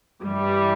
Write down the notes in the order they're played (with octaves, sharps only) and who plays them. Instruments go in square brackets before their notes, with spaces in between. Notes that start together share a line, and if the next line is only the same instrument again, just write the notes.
[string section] G2 E3 G3